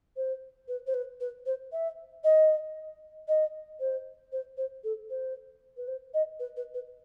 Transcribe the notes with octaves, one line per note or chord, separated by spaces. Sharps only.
C5
B4
C5
B4
B4
C5
E5
D#5
D#5
C5
C5
C5
A4
C5
B4
C5
D#5
B4
B4
B4